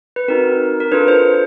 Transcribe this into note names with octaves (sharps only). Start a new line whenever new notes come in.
B4
C4 D#4 F#4 A#4
A#4
D4 F4 A4 B4
C5